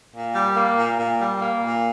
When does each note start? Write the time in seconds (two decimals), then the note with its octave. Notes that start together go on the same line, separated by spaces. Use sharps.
0.13 A#2
0.34 G3
0.56 A#3
0.77 A#2
0.98 A#2
1.19 G3
1.41 A#3
1.62 A#2